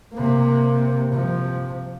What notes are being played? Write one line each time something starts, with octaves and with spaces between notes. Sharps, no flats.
C3 A#3
C3 F3